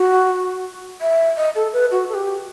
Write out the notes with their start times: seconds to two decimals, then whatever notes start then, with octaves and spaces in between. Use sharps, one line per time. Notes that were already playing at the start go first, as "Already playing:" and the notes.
Already playing: F#4
1.01 E5
1.37 D#5
1.55 A4
1.73 B4
1.91 F#4
2.09 A4
2.14 G4